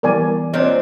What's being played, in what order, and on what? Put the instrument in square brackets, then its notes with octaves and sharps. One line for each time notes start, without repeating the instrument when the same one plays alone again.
[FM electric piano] E3 G3 B3 [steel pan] A#4 D5 G#5
[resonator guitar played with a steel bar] A#2 C4 D4 [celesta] C5 C#5 D#5